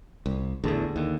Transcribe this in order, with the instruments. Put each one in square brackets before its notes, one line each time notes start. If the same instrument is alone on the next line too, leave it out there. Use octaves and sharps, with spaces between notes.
[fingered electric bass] C2
[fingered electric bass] A1 E2 [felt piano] D3 G#4 A4
[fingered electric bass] D#2